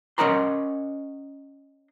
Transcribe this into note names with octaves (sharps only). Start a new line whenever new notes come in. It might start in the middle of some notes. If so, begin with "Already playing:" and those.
C#4 A#4 D#5 F#5 A#5 C6